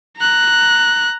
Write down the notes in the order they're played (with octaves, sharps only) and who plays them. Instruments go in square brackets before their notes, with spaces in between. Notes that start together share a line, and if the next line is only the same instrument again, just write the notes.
[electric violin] A#5 F#6